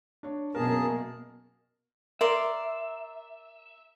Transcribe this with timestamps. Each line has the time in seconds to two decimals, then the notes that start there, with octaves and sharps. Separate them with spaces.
0.23 D4 C#5
0.55 F#2 B2 A#3 G#4 A#4 A5
2.21 A#4 D5 E5 C6